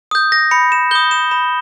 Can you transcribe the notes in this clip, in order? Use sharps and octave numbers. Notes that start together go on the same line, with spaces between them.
D#6 G6
A#6
B5 C#7
E7
D#6 G6 G7
E7
B5 E7